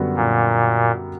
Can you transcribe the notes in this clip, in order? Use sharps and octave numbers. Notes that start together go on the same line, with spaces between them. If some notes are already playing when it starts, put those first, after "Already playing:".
Already playing: F#2 D3 G3 B3 F#4
A#2